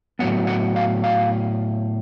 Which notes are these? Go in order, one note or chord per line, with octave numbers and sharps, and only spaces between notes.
A2 F#3 B3 F#5
F#5
F5
F5